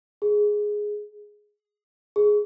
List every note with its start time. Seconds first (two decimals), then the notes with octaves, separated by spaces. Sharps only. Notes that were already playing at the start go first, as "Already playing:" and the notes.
0.22 G#4
2.16 G#4